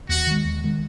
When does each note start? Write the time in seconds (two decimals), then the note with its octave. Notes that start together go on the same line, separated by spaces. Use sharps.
0.09 D#2 F#4
0.27 D#3 G#3
0.45 D#2
0.64 D#3 G#3